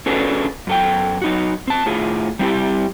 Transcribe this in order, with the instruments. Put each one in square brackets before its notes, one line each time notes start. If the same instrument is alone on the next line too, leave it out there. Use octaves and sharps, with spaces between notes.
[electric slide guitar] C#4 D4 F#4 G#4 A4 B4
F#2 A4 G5
F#3 D#4 F#4
C4 A5
A2 F4 G#4
G3 C4 E4 G4